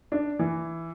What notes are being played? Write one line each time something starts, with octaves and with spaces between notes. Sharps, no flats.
D4
E3